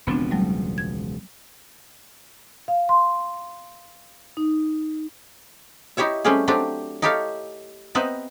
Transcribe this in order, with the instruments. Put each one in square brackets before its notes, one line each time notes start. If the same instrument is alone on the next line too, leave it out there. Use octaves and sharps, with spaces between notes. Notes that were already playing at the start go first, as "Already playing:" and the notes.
[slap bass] E1 C#2 F3 [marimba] B3 C4 D4
[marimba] F#3 G3 A3
G#6
F5
C6
D#4
[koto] D#4 E4 G4 C#5 E5
G3 A3 C4 C#4 G4 G#4
F#3 A3 C4 D4 G4
D#4 E4 G4 A4 C#5 F5
B3 C4 D#4 B4 D#5 E5